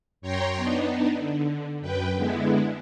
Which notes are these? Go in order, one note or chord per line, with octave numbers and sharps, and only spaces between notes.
F#2 C#5 G5 A#5 C6
B3 D4 D#4
D3
F#2 B4 G5
D3 G#3 B3 E4